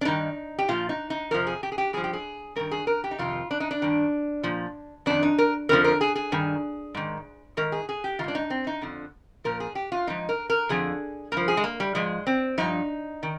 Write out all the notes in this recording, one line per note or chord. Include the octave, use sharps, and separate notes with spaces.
D4
G2 D#3 D#4
G4
A#2 F3 F4
D#4
D#4
F2 C3 F3 A#4
G#4
G4
G#4
G4
G2 F3 G#4
G4
G#4
G2 D#3 A#4
G#4
A#4
G4
D#4
F2 C3 D#3 F4
D4
D#4
D4
G2 D#3
A#2 F3
F2 D#3 D4
D#4
A#4
F2 D3 F3 A#4
A#4
G#4
G#4
G2 D#3
G#2 D#3
G#2 D#3 A#4
G#4
G#4
G4
G#2 D#3 D4 F4
D#4
C4
D#4
F2 D3 F3
A#2 F3 A#4
G#4
G4
F4
G#2 F3 D#4
A#4
A#4
F2 D3 F3 G#4
G2 F3 A#4
G#4
G#3
A#3
G3
G#2 F3 G#3
C4
G2 F3 D#4
D#3